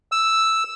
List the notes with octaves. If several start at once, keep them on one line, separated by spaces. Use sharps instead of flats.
E6